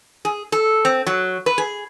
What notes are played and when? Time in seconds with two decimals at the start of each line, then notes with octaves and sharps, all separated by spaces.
0.25 G#4
0.52 A4
0.85 C4
1.07 F#3
1.46 B4
1.58 G#4